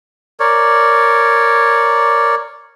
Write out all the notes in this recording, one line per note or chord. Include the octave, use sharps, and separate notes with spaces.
A#4 C#5 D5